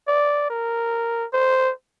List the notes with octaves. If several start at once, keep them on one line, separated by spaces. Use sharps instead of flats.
D5
A#4
C5